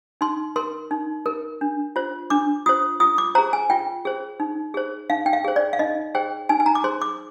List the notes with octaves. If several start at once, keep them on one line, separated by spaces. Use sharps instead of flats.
D#4 C6
A#4 C6
D#4
A#4
D4
F4 C5
D4 D6
F4 C5 D#6
F4 D#6
D6
G#4 C5 A#5
G#5
F4 G5
G#4 C5
D#4
G#4 C5
D#4 F5
G5
F5
G#4 C5
D5
F5
D#4 D#5
G#4 C5 G5
D#4 G#5
G#5
A#5
D6
G#4 C5 C6
D6